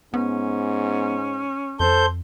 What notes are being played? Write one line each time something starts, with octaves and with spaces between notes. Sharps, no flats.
G#2 B3 C#4
F2 A4 C5 G6